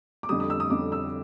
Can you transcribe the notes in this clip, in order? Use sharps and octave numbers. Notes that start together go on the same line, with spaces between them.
D6
F2 D3 G3 D#6
D#6
E6
D#6
F2 D3 G3 D6
E6